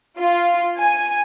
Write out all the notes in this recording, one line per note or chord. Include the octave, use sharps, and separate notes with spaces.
F4
G#5